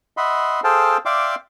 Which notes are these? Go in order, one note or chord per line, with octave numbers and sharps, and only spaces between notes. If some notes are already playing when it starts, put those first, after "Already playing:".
D#5 E5 F#5 B5 C6
G#4 A4 C5 F5 G5 A5
D5 E5 F5 G5 C6 D6